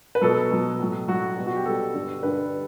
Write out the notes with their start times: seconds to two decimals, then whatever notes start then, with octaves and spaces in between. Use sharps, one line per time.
0.15 B4
0.22 B2 F#3 A4
0.51 B2 F#3
0.79 A2 F#3
1.08 A2 F#3 F#4
1.37 B2 G3
1.47 F#4
1.56 G4
1.65 B2 G3 A4
1.94 G2 D3 G3
2.23 G2 D3 G3 B4